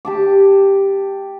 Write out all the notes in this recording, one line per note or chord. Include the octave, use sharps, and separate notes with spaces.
G4 A5 D6